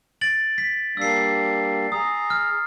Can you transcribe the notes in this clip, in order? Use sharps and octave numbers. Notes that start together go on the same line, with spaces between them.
A6 D7 F#7
B6
G3 A#3 D4 E6 C7
G#4 A#5 D#6
F6